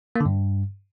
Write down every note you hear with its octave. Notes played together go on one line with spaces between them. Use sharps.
A#3
D3
G2